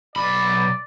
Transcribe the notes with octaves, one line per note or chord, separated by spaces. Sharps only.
B1 D5 B5